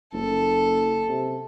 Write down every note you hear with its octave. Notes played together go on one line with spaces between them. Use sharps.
F#1 A4
C3